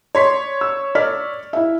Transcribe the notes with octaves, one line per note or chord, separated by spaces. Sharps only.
C#5 D5 C6 B6
E6
D5 F6 B6
E4 E5